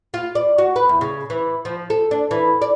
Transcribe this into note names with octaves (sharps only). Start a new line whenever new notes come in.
F4
D5
F#4
B4
E2
C#3
E3
F3
A4
D4
E3
D5